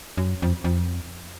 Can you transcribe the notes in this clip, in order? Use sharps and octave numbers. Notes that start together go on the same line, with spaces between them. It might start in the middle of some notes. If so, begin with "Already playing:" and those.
F#2
F2
F2